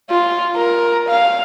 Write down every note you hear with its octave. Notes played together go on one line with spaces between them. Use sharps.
F4
A#4
F5